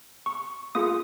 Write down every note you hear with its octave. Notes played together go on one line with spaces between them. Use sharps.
C#6
A#3 F4 G#4 D#6